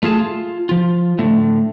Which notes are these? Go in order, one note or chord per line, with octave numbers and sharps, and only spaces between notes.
A3 F4 G#4 A5
F4
F3 F4
A2 D3 A3